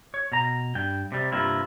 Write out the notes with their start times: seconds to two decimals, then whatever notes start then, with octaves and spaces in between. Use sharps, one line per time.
0.14 C#5
0.32 B2 A#5
0.75 G2 G5
1.12 C3 G3
1.32 G2 C3 A#3 E4 F4